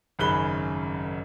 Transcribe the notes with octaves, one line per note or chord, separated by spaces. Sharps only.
G#1 F#2 C#3 B5 F#6 G7